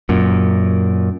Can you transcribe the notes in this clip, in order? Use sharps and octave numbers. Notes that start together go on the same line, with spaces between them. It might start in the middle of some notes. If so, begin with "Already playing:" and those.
F#2 A#2